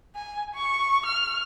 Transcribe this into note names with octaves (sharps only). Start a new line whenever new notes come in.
G#5
C#6
F6